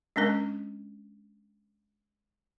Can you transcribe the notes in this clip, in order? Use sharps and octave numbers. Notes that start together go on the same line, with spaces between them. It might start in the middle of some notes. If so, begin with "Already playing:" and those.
G#3 C#4 D4 A#4